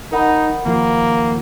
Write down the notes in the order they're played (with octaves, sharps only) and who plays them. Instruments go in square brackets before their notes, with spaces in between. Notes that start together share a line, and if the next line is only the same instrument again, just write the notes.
[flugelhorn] D#4 [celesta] A#4 F#5 B5
[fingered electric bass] D#2 F3 [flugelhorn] A#3